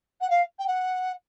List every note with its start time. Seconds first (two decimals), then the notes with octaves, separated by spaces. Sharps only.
0.20 F#5
0.30 F5
0.58 G5
0.67 F#5